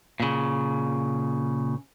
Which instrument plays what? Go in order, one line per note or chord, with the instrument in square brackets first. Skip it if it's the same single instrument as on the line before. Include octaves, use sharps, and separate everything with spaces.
[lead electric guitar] A#2 C#3